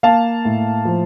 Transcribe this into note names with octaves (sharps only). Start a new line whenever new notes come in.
A#3 F5 A5
A2
F3